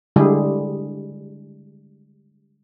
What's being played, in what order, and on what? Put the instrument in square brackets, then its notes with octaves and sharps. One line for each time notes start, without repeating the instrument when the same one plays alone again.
[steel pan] D3 G3 G#3 E4 G4 G#4